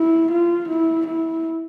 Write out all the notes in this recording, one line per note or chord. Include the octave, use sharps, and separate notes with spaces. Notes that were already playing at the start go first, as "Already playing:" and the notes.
Already playing: E4
F4
E4
E4